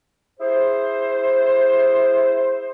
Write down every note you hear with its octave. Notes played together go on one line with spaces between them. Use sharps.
E4 G#4 C5